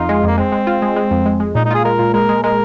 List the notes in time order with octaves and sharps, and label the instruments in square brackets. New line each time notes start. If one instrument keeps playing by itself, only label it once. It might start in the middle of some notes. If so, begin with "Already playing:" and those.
Already playing: [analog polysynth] F2 D#4 [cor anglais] F4
[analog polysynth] G#3
[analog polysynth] F2 [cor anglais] A#3
[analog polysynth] G#3 [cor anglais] C4
[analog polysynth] G#3
F4
G#3
G#3
F2
G#3
G#3
[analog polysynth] A#2 [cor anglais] D#4
[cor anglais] D#4
[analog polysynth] F4 [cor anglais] G#4
[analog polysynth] G#3 [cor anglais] A#4
[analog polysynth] A#2
[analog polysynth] G#3 [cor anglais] A#4
[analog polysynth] G#3
[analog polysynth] G#3 [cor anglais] A#4